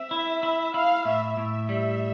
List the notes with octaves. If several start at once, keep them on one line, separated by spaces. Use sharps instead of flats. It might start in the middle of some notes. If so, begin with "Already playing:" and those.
Already playing: C4 E5
E4
E4
E4 F5
A2 E5
A2 E5
G3